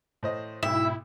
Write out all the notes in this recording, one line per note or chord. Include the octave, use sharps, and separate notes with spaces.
A2 C5 D#5
B1 G#2 B2 E4 E5 G5